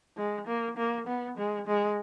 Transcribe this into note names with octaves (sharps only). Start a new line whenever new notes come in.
G#3
A#3
A#3
B3
G#3
G#3